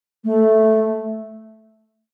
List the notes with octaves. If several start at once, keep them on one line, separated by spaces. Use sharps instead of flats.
A3